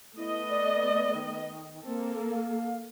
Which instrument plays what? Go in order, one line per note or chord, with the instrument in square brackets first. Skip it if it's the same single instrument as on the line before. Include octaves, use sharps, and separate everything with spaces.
[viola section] A3 B3 D#5 [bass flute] E4
[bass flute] D5
D#3
[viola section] A#3 A4 [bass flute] C4
[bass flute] F5